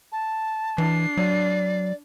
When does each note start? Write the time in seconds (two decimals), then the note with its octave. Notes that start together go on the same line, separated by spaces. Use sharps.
0.12 A5
0.78 E3 D4 C7
1.17 F#3 D5